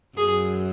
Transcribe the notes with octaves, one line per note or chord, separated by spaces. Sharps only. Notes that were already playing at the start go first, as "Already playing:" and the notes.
F#2 G#4